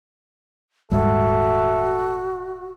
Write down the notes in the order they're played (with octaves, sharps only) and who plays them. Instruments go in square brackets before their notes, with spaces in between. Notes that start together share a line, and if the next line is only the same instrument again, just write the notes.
[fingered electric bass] D#1 G#2 G3 [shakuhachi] F#4 [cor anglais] A4 [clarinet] E5